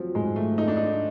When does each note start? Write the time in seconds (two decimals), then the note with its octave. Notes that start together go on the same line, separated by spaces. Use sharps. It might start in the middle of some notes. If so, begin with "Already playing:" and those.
Already playing: F3 F#3 C4
0.15 G#2 G#3
0.36 A3
0.58 A3 D#4
0.68 D4
0.77 D#4